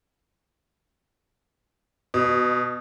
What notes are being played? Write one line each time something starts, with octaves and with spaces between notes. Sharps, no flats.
B2